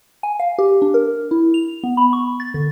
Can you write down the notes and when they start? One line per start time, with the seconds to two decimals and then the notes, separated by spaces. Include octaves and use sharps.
0.23 G#5
0.40 F5
0.59 G4
0.82 D4
0.94 A#4
1.31 E4
1.54 F7
1.84 B3
1.97 B5
2.13 C#6
2.40 A6
2.54 D3